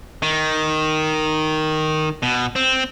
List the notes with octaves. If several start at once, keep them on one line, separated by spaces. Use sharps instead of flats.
D#3
B2
C4